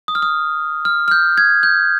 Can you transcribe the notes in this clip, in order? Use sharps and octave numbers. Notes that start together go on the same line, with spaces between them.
D#6
F6
D#6
F6
F6
G6
G#6
G6